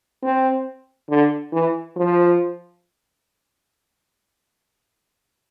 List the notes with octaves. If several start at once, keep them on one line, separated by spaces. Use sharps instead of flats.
C4
D3
E3
F3